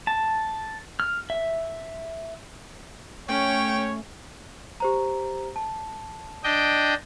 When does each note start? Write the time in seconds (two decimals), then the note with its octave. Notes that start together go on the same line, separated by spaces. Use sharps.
0.07 A5
1.00 F6
1.30 E5
3.29 A3 C#4 C#5 G5
4.80 G4 C5 A#5
5.56 A5
6.44 D4 D#5 G5